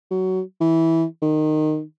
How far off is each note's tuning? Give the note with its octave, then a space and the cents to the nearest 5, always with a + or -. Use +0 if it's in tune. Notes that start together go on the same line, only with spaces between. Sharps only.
F#3 +15
E3 -10
D#3 -15